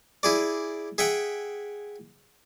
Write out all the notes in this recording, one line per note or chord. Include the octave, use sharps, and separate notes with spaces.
E4 G#4 D5
G#4 E5 F#5 G5